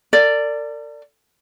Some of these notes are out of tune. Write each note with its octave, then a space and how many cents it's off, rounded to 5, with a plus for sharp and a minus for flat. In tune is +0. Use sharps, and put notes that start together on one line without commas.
A#4 -45 D5 +0